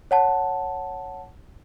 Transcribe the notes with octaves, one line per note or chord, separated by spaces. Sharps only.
C#5 F#5 A5